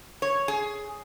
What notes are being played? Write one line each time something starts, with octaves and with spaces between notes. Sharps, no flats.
C#5
G#4